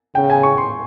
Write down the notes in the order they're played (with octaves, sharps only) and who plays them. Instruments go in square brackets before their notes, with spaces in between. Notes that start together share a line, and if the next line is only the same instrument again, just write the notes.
[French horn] C#3 [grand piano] G5
[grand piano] G#5
C#6
C6